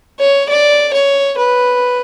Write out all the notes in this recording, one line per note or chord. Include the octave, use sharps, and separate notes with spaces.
C#5
D5
C#5
B4